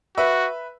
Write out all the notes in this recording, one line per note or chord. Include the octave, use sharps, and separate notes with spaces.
F#4 B4 E5